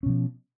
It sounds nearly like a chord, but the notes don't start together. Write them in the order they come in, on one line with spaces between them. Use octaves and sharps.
C#4 B2 F3